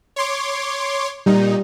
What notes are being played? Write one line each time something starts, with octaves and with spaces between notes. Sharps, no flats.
C#5 C6 D6
A#2 G3 D#4